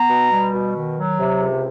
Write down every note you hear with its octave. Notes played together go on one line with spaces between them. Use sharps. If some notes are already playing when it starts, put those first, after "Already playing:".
Already playing: B3 A#5
B2
G3
B2
D#3
F#3
C3
C#2